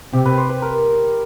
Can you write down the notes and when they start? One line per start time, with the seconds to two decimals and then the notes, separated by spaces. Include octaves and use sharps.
0.13 C3 G4
0.25 B4
0.37 C5
0.49 B4
0.62 A#4